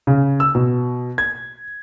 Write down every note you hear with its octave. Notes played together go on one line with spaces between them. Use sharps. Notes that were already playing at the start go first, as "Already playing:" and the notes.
C#3
E6
B2
G#6